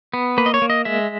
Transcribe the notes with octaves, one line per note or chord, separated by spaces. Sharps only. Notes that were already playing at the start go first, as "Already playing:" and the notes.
B3
A#3 B4
D#5
C#5
A#3
D#5
G#3 E5